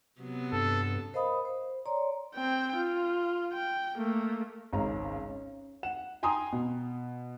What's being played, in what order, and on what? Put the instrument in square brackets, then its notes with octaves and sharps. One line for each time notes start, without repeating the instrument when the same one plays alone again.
[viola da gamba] C3 F#3 B3
[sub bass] G2 [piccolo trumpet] A4
[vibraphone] A#4 C5 D#5 F5 B5 D#6
C5
C#5 D5 A#5 C6
[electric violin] C4 G5
F4
G5
A3 A#3
[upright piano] G#1 C#2 C#4 A#5
C#4
F#5 E7
G5 G#5 A#5 C6 D#6
B2